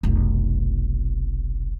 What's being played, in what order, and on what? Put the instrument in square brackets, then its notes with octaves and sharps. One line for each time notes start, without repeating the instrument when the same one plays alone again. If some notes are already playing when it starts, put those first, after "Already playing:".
[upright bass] F1 B1